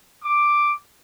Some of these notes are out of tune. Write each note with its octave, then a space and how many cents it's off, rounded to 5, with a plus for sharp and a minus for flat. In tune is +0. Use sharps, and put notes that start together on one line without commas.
D6 +5